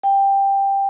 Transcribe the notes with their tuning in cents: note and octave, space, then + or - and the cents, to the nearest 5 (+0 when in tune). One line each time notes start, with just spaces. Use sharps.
G5 +10